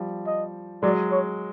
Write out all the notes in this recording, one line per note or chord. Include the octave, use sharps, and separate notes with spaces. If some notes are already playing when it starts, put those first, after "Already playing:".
Already playing: F3 G3
D#5
F#3 G#3 D5
C#5